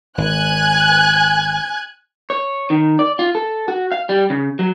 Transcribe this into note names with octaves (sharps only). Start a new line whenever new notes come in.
G#1 G#5 F#6 G#6
C#5
D#3
D5
F4
A4
F#4
F5
G3
C#3
F#3